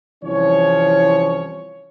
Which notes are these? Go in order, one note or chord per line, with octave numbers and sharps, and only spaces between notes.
C2 E3 F3 C#4 C#5